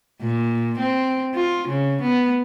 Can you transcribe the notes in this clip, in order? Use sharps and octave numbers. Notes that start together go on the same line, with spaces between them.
A#2
C4
F4
C#3
B3